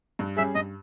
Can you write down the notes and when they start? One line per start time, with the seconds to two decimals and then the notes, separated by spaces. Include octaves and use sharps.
0.19 G2
0.37 G3 C#4 G#4 E5
0.55 G2 D#5